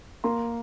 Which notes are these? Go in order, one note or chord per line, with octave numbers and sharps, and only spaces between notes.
A#3 A#5 C6